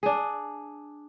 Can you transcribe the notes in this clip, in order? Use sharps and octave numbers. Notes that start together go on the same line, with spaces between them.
D4 G#4